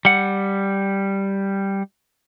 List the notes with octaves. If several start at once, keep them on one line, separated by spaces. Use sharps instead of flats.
G3 F#5